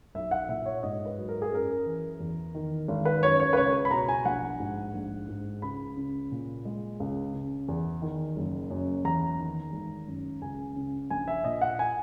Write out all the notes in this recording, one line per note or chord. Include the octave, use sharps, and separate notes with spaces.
B1 E5
F#5
A#2 E5
C#5
G#2 D#5
B4
F#3
A#4
G#4
F#2 A#4
E3
E2
D#3
G#1
B4
F#2 C#5
C#5
B4
C#2 C#5
B5
B2 A#5
G#5
A#1 F#5
G#2
A#1
G#2
C#2 B5
C#3
A#2
G#3
C#2
C#3
E2
D#3
F#1
F#2
E2 A#5
D#3
G#1
F#2
C#2 G#5
C#3
A#1 G#5
E5
A#2 D#5
F#5
G#5